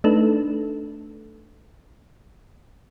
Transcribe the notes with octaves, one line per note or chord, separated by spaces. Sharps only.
A3 D4 D#4 A4 B4